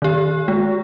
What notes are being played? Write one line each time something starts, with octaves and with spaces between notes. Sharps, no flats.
D#3 G4
G#3